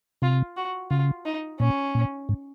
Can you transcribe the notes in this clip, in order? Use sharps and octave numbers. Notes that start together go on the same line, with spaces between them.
C3 F4
F#4
C#3 F4
D#4
A#2 C#4
A#2
G#2